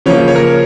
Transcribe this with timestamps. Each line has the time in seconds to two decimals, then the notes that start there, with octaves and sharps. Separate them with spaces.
0.06 C#3 F3 A#3 C#5
0.28 C#5
0.36 A#4